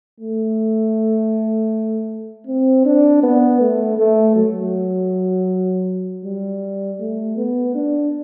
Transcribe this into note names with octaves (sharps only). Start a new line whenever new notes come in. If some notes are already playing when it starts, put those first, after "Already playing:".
A3
C4
D4
B3
A3
A3
F#3
G3
A3
B3
D4